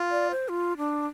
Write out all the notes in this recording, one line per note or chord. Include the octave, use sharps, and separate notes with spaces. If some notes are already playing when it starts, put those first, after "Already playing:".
Already playing: F4
D5
C5
F4
D4